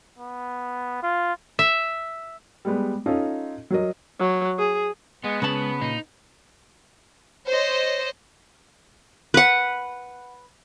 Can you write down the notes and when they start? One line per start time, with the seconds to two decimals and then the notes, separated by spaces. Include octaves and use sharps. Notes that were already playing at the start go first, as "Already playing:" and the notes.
0.18 B3
1.03 F4
1.59 E5
2.65 G3 G#3 B3
3.06 C#4 D#4 F4 A4 D#5
3.70 F#3 F#4 A#4 D#5
4.20 F#3
4.59 G#4
5.24 G#3 B3
5.42 C#3 G#3 B4 A5 B5
5.81 A#2 D#4
7.48 C5 C#5 D#5
9.34 B4 F#5